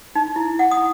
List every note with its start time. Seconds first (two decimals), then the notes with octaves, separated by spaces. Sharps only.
0.15 D#4
0.36 E4
0.59 F#5
0.71 D#6